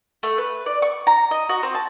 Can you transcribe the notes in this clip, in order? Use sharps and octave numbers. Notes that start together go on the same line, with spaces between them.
A3
B4
D5
C#6
A#5
D#5
F#4
C4
A5